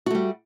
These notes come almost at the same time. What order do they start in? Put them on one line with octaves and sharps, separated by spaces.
F#4 A3 G3